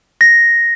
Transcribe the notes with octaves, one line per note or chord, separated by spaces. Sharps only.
A#6